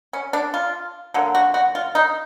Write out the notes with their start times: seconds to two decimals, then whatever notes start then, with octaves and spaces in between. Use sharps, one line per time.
0.13 C#4
0.33 D4
0.54 F4
1.14 D3 F#3 A#3
1.35 F#4
1.54 F#4
1.75 F4
1.95 D#4